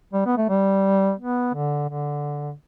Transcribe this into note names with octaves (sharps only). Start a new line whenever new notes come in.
G3
B3
A3
G3
B3
D3
D3